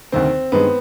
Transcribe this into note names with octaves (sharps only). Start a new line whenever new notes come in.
D2 C3 D#3 C4
G2 D#3 G#3 B3